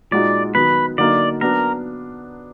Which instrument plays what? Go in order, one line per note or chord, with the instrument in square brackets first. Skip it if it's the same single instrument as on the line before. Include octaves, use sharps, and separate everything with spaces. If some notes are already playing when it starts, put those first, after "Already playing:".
[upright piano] A#2 G#3 D#4 F#4 [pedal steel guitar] D5
[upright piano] D#3 F#3 B3 [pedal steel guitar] B4
[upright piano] D3 F#3 A#3 D#4 [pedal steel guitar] D5
[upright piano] F#3 B3 D4 [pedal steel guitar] A#4